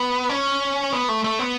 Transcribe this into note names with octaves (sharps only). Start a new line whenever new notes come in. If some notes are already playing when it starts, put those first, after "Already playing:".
Already playing: B3
C#4
B3
A3
A3
B3